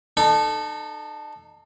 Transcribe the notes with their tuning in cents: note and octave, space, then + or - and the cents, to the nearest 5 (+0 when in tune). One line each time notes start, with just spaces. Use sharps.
D#4 -35 A4 -5